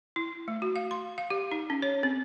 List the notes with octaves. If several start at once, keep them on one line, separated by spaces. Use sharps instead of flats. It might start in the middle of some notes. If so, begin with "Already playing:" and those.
E4
A3
F#4
F5
C6
F5
G4
D#4
C#4
C#5
C4